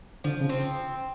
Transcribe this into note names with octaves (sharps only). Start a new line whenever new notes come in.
D3 F3
C#3
C4